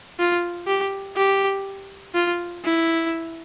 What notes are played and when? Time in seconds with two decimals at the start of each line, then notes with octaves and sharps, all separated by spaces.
0.19 F4
0.67 G4
1.16 G4
2.14 F4
2.64 E4